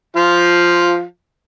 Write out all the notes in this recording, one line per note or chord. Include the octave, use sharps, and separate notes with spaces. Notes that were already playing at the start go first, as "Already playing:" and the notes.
F3 F4